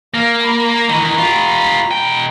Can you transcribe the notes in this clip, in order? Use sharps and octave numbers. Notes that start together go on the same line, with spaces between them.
A#3 F5
A#5 B5
D#3 E3
F4 G4
B2 G5